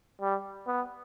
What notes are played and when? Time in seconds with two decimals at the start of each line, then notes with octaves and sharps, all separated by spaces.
0.21 G3
0.67 B3